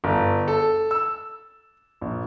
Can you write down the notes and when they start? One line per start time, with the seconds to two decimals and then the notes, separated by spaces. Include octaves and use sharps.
0.04 G1
0.48 A4
0.91 E6
2.01 A#1